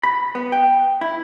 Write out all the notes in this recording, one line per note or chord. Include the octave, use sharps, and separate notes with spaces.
B5
B3
G5
E4